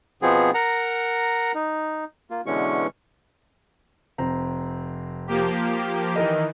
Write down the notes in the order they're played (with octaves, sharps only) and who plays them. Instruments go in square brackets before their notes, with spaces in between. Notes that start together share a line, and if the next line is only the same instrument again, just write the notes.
[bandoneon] B2 F3 B3 C4 G#4
A#4 F#5 A#5
D#4
A#3 F4
B2 D3 E3 G#3 C#4 C#6
[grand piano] F1 C4 A#5
[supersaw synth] F3 A#3 G4
[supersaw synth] D#3 E3 [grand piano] D#4 A#4 D#5